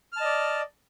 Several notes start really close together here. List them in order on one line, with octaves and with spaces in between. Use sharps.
F6 A5 D#5 D5